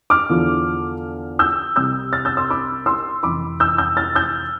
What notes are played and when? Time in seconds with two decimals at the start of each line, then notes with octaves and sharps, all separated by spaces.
0.10 D6 F6
0.29 E2 D3 F3
1.39 E6 G6
1.76 C2 C3 G3 E6 G6
2.13 F6 A6
2.25 E6 G6
2.37 C6 E6
2.50 B5 D6
2.86 C6 E6
3.23 F1 F2 E3 B5 D6
3.60 E6 G6
3.78 E6 G6
3.97 F6 A6
4.15 E6 G6